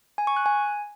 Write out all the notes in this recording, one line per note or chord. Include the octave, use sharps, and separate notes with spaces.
G#5
C#6
F#6
G#5